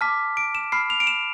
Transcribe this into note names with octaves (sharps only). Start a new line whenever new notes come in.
A5 D6 F6 B6
D7
E7
B5 F6 C7
F7
D7
E7